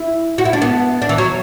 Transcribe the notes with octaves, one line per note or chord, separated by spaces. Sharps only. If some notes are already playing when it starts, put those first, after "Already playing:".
Already playing: E4
F#4
E4
D4
B3
D4
E3
F#3